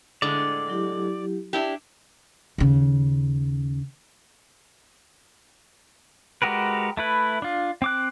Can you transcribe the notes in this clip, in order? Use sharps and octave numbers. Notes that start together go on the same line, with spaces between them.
A2 D3 G#3 D5
F#3 E4 G4
D4 E4 G4
D#2 C#3
G#3 F#4 G4 A#4 B4
A3 E4 B4
D4 F4
C4 D6 F#6